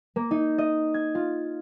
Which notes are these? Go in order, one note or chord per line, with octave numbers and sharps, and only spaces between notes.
A#3
D#4
D#5
G#6
F4